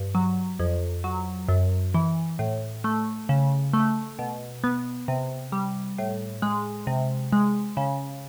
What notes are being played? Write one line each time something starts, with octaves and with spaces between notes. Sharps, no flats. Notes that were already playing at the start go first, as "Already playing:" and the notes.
Already playing: G2
F#3
F2
F#3
F#2
E3
A2
A3
C#3
A3
B2
B3
C3
G3
A2
G#3
C3
G#3
C#3